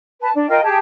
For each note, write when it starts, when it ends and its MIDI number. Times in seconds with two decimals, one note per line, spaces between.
0.20 0.28 71
0.20 0.28 81
0.33 0.45 62
0.48 0.59 65
0.48 0.59 70
0.48 0.59 75
0.48 0.59 79
0.62 0.77 67
0.62 0.77 68
0.62 0.77 81